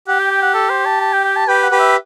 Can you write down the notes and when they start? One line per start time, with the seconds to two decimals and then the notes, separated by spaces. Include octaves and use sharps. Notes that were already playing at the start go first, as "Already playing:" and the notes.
0.07 G4 F#5
0.19 G5
0.30 G5
0.42 F#5
0.54 A4
0.70 C5
0.85 A5
1.01 A5
1.13 G5
1.24 G5
1.36 A5
1.47 G4 B4 G5
1.63 F#5
1.71 G4 B4
1.79 E5